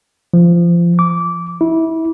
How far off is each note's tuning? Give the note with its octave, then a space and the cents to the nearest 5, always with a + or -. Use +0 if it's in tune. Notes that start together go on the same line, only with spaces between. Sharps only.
F3 -25
D6 -15
E4 -25